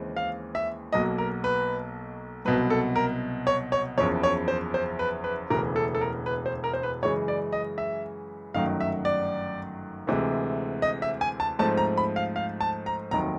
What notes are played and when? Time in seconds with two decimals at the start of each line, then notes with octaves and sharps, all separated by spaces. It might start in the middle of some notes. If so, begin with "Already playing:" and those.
Already playing: D#2 C#3 E3 G#3 C4
0.17 F5
0.55 E5
0.93 B1 B2 F#3 A#3 D#5
1.18 A#4
1.44 B4
2.45 C2 B2 F#3 B4
2.70 A4
2.96 A#4
3.47 C#5
3.72 C#5
3.98 F#1 E2 C#3 F3 C#5
4.23 C#5
4.48 C5
4.74 C5
4.99 B4
5.24 B4
5.50 E1 D2 C#3 E3 A#4
5.76 A4
5.95 A4
6.01 A#4
6.26 B4
6.46 C5
6.64 A#4
6.74 C5
6.83 B4
7.02 F#2 C#3 E3 G#3 C#5
7.28 D5
7.53 D#5
7.78 E5
8.54 G1 F#2 D#3 F#3 A3 F5
8.80 E5
9.05 D5
10.07 D2 C3 E3 G#3
10.82 D#5
11.02 E5
11.21 G#5
11.40 A5
11.59 G#2 F3 A3 C4 A5
11.77 A#5
11.98 B5
12.16 F5
12.36 F5
12.61 A5
12.86 A#5
13.11 F1 D#2 D#3 F#3 A#5